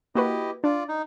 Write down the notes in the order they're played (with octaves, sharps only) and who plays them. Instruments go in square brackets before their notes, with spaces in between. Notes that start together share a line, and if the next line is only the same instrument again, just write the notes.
[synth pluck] A#3 F#4 B4 [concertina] E4 G4 D#5
[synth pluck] D4 [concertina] F4 D5
[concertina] D#4